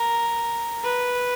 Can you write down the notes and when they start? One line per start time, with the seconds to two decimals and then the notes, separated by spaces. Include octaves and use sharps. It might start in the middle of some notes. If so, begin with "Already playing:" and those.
Already playing: A#4
0.84 B4